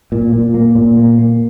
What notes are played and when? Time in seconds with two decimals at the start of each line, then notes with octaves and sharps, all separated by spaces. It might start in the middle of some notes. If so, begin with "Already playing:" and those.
0.12 A#2
0.33 A#2
0.54 A#3
0.75 A#2
0.97 A#3
1.18 A#3